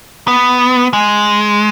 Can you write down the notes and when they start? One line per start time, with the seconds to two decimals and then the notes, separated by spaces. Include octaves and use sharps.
0.28 B3
0.93 G#3